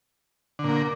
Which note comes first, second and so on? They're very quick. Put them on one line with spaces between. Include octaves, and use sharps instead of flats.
D3 A#2 A#3